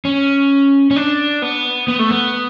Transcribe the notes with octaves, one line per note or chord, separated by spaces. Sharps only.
C#4
C#4
D4
B3
B3
A3
B3